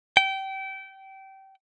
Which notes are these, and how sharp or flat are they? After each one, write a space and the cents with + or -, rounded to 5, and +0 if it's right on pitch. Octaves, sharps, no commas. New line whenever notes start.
G5 -25